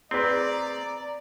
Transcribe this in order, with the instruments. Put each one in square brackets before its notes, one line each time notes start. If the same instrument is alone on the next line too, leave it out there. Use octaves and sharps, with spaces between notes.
[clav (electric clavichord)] C4 [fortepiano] G#4 B4 [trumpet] D5 [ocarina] A#5